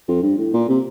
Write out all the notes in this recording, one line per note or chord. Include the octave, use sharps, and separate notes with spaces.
F2
G2
A2
A#2
C3